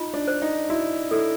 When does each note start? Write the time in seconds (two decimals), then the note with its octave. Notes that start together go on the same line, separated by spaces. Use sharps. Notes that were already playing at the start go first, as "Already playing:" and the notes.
Already playing: D#4 F4
0.14 D4
0.27 C5
0.42 D#4
0.70 E4 F#4
1.11 E4 A4